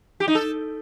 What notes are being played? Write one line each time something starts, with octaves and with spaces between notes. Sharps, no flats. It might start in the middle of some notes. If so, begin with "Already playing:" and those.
G4
D#4
A4